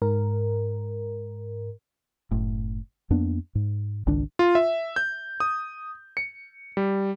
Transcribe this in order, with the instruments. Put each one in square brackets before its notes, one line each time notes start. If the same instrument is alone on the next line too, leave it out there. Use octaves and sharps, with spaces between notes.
[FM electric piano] G#2 A#4
[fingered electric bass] F#1 A2
F2 A#3 B3 D4
G#2
G#1 C#2 D#3 D4
[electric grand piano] F4
E5
G6
D#6
C#7
G3